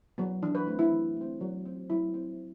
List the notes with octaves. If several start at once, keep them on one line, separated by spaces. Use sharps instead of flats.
F#3 B3
E3 D4
B4
A3 C4
E4
E3
A3 C4
F#3
C4
F#3 E4
C4